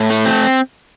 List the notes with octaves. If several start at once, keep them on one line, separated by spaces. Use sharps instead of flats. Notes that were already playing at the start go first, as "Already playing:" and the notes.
Already playing: A2
A3
C4